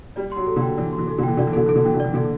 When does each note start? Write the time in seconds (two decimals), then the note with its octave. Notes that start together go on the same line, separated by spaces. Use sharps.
0.16 G3 D5
0.32 F#3 C6
0.47 A4
0.56 D3
0.62 G5
0.77 E3 D5
0.93 C6
0.98 E3
1.08 A4
1.18 D3
1.23 E3 G5
1.37 D3 D5
1.47 E3
1.53 D3 A4
1.66 E3 A4
1.76 D3
1.85 E3 G5
1.94 D3
2.00 E3 D5
2.14 D3 A4